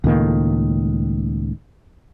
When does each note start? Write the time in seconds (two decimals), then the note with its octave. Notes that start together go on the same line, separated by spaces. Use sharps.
0.04 C#2 A2 D#3 A#3